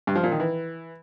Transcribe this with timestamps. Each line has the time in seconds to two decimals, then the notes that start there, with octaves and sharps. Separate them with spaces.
0.07 G2
0.15 F3
0.24 A#2
0.32 D#3
0.40 E3